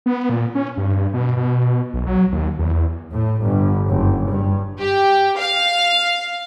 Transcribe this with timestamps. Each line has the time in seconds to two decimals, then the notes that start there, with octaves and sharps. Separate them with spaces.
0.06 B3
0.29 A#2
0.55 C#4
0.77 G2
1.14 B2
1.37 B2
1.93 B1
2.07 F#3
2.32 D#2
2.59 E2
3.12 A2
3.42 G1
3.90 F#1
4.29 G2
4.79 G4
5.37 F5